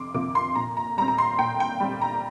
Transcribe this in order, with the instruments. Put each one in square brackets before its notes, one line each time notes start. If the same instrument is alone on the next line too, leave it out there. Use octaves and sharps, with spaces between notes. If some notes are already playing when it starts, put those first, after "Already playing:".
Already playing: [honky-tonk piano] F2 C3 C6 D6
C3 F3 A#3 D6
C6
A#2 A#5
A#5
G3 A#5
C4
A#5
C6
A#2 G5
G5
G3 C4
A#5